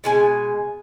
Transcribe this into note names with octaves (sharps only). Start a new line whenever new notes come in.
B2 G#3 G#5